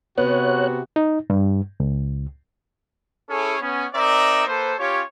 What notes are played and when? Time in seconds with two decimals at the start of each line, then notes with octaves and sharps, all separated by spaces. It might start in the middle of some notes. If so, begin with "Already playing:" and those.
0.18 C3 B3 F#4 C#5 F#6
0.96 D#4
1.30 G2
1.80 C#2
3.30 C#4 E4 G#4 A4 C#5
3.61 B3 C#4
3.94 C4 D#4 A#4 D5 E5
4.47 A#3 A4 B4 C5
4.78 C#4 F4 G4 C#5